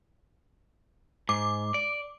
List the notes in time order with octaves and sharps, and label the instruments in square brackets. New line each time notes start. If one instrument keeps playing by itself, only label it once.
[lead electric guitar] G#2 [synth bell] D6
[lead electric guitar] D5